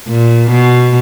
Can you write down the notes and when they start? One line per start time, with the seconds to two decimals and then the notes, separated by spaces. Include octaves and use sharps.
0.08 A#2
0.51 B2